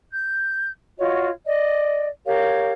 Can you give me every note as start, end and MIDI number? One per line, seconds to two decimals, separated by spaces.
0.11 0.69 91
0.97 1.28 65
0.97 1.28 66
0.97 1.28 73
0.97 1.28 75
1.45 2.06 74
1.45 2.06 75
2.26 2.72 67
2.26 2.72 70
2.26 2.72 73
2.26 2.72 77